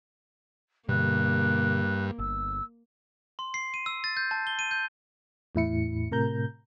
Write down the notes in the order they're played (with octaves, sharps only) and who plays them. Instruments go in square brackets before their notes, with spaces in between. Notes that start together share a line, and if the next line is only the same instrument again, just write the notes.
[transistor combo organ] G2 [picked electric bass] B2 D3 [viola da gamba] A#3 [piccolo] F#6
[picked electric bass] G1 [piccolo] E6
[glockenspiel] C6
C7
D#7
E6
A6
G6
A5
G7
D#7
G6
[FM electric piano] E2 A2 E4 C#7
A2 C3 A#4 A#5 G6